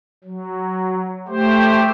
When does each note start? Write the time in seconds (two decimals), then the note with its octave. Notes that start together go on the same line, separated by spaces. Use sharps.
0.24 F#3
1.28 A3 G4 C5